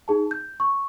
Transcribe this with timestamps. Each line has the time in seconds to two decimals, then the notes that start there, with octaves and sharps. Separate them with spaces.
0.08 D#4 G#4 A5
0.31 G6
0.60 C#6